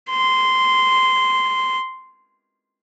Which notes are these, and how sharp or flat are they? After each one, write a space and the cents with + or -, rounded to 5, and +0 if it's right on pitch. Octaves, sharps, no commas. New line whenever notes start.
C6 -10